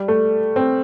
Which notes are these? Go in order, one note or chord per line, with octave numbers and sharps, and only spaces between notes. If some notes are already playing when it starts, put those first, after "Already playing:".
Already playing: G3
A3
C4